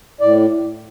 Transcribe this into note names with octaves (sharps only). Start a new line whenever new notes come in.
A2 D5